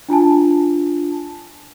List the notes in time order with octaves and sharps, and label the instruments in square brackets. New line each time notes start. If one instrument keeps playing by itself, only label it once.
[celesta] D4 F4 G#5 A5